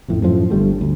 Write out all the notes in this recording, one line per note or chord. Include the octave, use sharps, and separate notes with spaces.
A1 F2 A2
F#2 A2 F3
G1 D3 G3 A3
D2